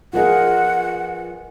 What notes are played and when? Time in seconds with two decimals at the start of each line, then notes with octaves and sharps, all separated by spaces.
0.13 F3 B3 F4 G#4 A#4 D#5 F#5